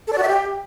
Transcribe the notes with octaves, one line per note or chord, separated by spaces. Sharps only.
A4
D5
F#4
E5
G4